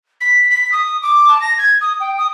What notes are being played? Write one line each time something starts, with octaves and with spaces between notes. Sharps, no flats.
B6
B6
D#6
D6
A5
A#6
G#6
D#6
G5
D#6